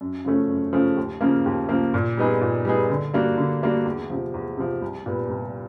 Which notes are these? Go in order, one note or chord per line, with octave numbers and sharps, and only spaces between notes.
F#2
C#3 F3 A3 C#4
F#2
C#3 F3 A3 C#4
D#2
C#3 F3 A#3
D#2
C#3 F3 A#3
A#2
G3 B3 D#4 G#4
A#2
G3 B3 D#4 G#4
D3
G3 A#3 D4 F#4
D3
G3 A#3 D4 F#4
E2
C3 F3
E2
C3 F3
C2
A#2 G3 B3
C2